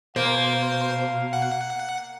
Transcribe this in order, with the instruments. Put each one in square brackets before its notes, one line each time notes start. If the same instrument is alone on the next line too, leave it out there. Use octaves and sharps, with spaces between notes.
[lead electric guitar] B2 [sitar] A#3 [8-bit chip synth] C5 [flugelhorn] F5
[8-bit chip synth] F#5